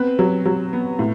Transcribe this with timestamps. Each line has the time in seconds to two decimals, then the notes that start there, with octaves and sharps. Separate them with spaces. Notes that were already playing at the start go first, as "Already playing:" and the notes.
Already playing: B3 C4 B4
0.19 F#3
0.46 F#3
0.73 B3
0.99 A2